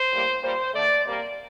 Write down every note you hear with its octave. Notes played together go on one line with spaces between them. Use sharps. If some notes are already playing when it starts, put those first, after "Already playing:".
Already playing: C5
A2 G3 A#3
A#2 G3 A#3 C5
D3 A3 D5
C3 G3 A#3 D5